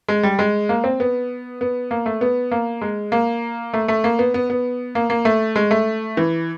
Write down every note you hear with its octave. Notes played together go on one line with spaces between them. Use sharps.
G#3
G3
G#3
A#3
C4
B3
B3
A#3
A3
B3
A#3
G#3
A#3
A3
A3
A#3
B3
B3
B3
A#3
A#3
A3
G#3
A3
E3